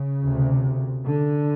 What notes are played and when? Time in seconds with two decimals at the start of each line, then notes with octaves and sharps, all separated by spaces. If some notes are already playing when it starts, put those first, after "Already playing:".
Already playing: C#3
0.24 D2 C3
1.07 D3